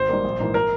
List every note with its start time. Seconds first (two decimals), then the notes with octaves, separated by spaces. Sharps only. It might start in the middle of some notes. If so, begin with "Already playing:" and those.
Already playing: G#1 C5
0.09 G#2 G3 A#3
0.24 A#1
0.40 G#2 E3 A#3
0.54 A#4